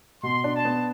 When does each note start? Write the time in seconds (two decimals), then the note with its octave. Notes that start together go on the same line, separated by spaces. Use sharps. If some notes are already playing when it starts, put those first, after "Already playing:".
0.23 B2 C6
0.44 D4
0.55 A5
0.65 B3